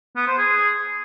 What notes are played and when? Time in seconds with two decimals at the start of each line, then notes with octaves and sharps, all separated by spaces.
0.16 B3
0.27 C5
0.38 G#4